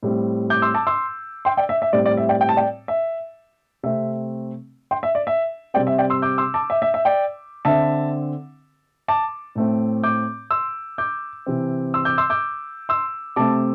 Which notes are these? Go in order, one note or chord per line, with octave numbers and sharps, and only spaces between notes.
A2 G3 C4
D6 G6
C6 E6
A5 D6
C6 E6
G5 C6
D5 G5
E5
E5
A2 G3 C4 D5
D5
E5
D5 G5
G5
A5
D5 G5
E5
C3 A3 C4 E5
G5 C6
E5
D5
E5
C3 G3 C4 D5 G5
E5
D5 G5
C6 E6
D6 G6
C6 E6
A5 D6
E5
E5
E5
D5 G5
D3 C4 E5 A5
A5 D6
A2 A3 C4
D6 G6
C6 E6
D6 G6
C3 E3 C4
C6 E6
D6 G6
C6 E6
D6 G6
C6 E6
C3 A3 C4 A5 D6